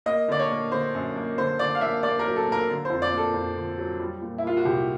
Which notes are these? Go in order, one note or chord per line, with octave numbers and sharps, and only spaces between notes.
A#3 D#5
D3 D5
C#5
A#3
D3 C5
F#2
A#3
D3 C5
D3 D5
F5
A#3 E5
A#3 D5
A#4
F#3
A4
A#3
A#4
D3
C5
F2
D5
A#3
A4
F2
D3
F#3
G3
A#2
E4
A#3 F4
F#4
C2 G4